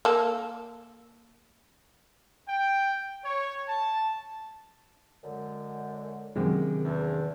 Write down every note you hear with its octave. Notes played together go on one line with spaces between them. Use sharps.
A#3 A4
G5
C#5
A5
F#2 D3 G#3
F#2 C3 D#3 G#3
E2 D4